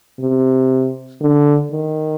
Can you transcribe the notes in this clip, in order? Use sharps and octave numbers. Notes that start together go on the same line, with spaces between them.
C3
D3
D#3